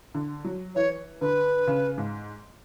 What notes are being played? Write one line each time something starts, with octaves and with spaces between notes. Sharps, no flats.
D3
F#3
E3 C#5
D3 B4
C#3
G#2